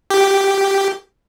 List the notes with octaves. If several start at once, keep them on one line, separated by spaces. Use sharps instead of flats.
G4